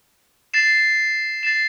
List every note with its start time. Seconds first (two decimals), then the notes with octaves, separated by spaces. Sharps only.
0.54 A6 C7 E7
1.43 A6 C7 E7